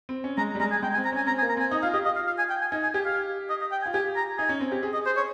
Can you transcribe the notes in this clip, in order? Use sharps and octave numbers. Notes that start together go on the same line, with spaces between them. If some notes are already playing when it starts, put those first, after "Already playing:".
C4
C#4
G#3 A#5
G3
G#3 A#5
G#5
G#3 G5
G#5
C4
A#5
C#4 G#5
C4 A#5
G#5
A#3
A#5
C4 G#5
D#4 D#5
F4 F5
G4 D#5
F4 D#5
F5
F5
G#5
G5
G#5
D#4 G#5
G#5
G4 G#5
F5
D#5
D#5
G5
G#5
F4
G4 G#5
A#5
D#4 G#5
C#4
C4
G4
G#4
D#5
C5
C#5